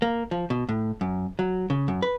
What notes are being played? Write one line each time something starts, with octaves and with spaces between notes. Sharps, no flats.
A#3
F3
B2
A2
F#2
F#3
C#3
F#2
B4